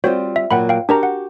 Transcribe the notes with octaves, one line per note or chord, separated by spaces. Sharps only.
G3 C4 F4 F#4 C5 C#5
E5
A#2 F#3 F#5 G5 B5
F5 G5
D4 F#4 G4 A#4 A#5
F#5